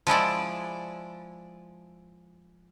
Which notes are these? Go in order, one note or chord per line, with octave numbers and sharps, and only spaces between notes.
F3 G#3 E4 D5